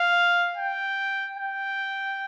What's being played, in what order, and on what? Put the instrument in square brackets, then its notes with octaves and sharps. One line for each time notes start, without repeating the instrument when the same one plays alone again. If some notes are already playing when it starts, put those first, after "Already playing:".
Already playing: [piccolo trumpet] F5
G5
G5